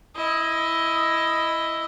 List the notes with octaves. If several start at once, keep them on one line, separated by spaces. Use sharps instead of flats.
E4 D#5